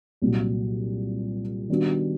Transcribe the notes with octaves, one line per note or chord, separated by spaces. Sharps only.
C2 A#2 F#3
D#3 G3 B3 D4 F#4